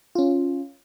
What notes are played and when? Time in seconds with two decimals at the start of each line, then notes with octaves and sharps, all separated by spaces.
0.15 C#4 F4